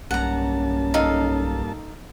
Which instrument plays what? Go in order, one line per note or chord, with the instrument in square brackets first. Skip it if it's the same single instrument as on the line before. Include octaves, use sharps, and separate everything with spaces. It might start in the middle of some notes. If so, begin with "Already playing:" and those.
[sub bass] B1 [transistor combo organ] G2 A#3 A5 [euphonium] C#4 [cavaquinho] F#5 A#5
[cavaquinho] D#4 A4 F5